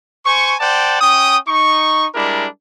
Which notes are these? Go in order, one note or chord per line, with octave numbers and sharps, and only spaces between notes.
C5 G#5 C#6
C5 D5 F#5 G5 A5
C#4 G5 D#6
D#4 C#6
G3 G#3 D4 E4 A#4